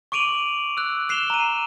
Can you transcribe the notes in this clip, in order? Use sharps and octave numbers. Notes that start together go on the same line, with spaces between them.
C#6 D6 D7 D#7 F7 F#7
E6 F#6
F#6 C7 E7 F7 G7
A#5 D#7